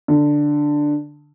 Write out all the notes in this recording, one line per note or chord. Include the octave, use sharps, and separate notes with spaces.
D3